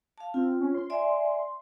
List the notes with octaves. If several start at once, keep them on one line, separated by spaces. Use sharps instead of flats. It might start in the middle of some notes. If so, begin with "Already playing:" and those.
F5 A5
C4 F4
C#4
C6
D5 E5 G#5